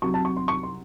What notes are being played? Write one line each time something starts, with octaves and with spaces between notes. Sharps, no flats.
C2 C3 F#3 C#6
A5
C#6
C6
C#6
C6